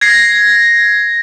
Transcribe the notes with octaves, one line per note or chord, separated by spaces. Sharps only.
G#6 A#6 C7